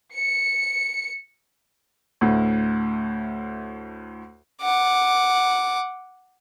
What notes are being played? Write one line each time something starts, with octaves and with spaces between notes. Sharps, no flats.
C#7
D2 A2
F#5 D6